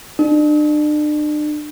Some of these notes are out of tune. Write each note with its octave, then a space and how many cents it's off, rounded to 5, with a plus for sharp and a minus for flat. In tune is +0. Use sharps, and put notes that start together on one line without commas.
D4 +40